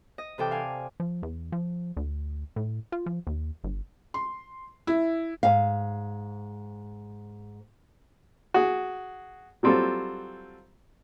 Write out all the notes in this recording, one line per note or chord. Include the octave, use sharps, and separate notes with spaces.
D#5
C3 E3 A4 D5 G5
F5 G#5
F3
E2
F3
D2
A2
F4
F3
D#2
G1
C6
E4
G#2 F5
F#4 G#4
F#3 G3 C4 F4 A4